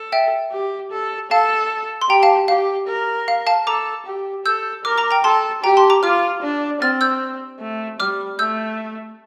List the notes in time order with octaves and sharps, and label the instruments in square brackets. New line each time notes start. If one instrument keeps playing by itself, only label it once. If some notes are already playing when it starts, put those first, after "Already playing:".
Already playing: [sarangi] A4
[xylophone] E5 G5
[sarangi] G4
A4
[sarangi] A4 [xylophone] F5 A5
[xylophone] C6
[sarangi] G4 [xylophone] G5 A#5
[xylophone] F5 A5
[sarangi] G4 [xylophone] F5
[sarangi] A#4
[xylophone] F5
F5 A5
[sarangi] A4 [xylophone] A#5 D6
[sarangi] G4
[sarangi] A4 [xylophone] E6 G6
[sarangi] A#4 [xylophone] D6 F6
[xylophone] A#5 D6
G5 A#5
[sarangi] A4 [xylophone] A5 C6
[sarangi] G4 [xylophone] G5 A#5
[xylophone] A5 C6
A#5 D6
[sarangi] F4 [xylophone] D6 F6
[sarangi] D4
[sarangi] C4 [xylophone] F6 A6
[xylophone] E6 G6
[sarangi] A3
[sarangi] G3 [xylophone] D6 F6
[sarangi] A3 [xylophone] E6 G6